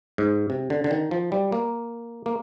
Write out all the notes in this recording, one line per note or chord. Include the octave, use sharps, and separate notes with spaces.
G#2
C3
D3
D3
D#3
F3
G3
A#3
A#3